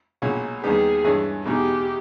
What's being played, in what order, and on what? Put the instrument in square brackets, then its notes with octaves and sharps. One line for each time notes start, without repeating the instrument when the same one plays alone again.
[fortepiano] B1 A#2 G#3 C#4
[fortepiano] D#2 D#3 G3 B3 G4 [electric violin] G#4
[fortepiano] G2 E3 G#3 C#4
[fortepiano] E2 B2 G#3 D#4 G#4 [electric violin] G4